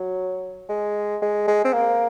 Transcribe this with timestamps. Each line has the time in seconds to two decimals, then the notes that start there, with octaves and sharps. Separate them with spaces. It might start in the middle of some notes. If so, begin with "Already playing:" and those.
Already playing: F#3
0.69 G#3
1.22 G#3
1.47 G#3
1.65 C4
1.74 A#3